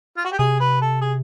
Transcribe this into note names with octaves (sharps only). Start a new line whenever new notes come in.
F4
F#4
G4
C3 G#4
B4
A4
G#4